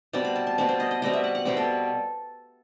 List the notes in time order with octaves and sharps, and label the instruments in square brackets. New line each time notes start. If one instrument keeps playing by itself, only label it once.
[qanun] B2 G3 C4 A5
B5
A5
A5
B2 G3 C4 A5
C5
D#5
D#5
B2 G3 C4 D#5
E5
F#5
F#5
B2 G3 C4 G5
A4